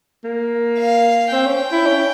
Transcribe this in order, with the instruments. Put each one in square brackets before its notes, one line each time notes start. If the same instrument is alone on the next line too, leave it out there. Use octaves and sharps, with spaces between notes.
[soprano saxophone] A#3
[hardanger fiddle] F5
[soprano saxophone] C4 [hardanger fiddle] G5
[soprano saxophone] C#4
E4
C#4